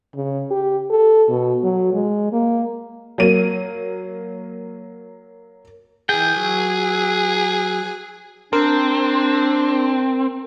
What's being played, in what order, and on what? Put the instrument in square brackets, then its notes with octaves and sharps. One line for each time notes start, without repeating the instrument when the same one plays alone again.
[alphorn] C#3
G4
A4
B2
F#3
G#3
A#3
[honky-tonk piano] F#3 A#3 D#7
[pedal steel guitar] E3 G5 [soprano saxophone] G#4
[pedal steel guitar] F#3
[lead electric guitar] C4 [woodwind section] D4 [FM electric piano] A#4